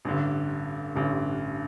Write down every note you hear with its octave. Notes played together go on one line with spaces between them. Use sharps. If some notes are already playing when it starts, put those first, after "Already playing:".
A1 G2 D3
A1 G2 D3